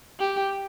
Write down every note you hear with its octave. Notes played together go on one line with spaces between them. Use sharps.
G4